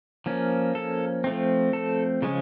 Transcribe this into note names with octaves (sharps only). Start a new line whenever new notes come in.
F3 A#3 C#4
A4
F3 A3 C4
A4
C#3 F3 G#3 C#4